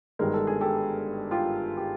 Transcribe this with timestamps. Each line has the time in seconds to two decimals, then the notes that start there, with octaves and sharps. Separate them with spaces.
0.19 G1 G2 D#3 G#3 A#4
0.34 A4
0.47 G#4
0.61 G4 A4
1.31 F4 G4
1.77 G4